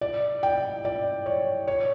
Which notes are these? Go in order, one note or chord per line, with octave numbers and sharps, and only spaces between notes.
D5
G5
D5
C#5
C#5